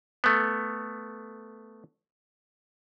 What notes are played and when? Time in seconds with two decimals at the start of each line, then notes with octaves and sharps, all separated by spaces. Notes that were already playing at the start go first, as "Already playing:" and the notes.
0.24 A3 B3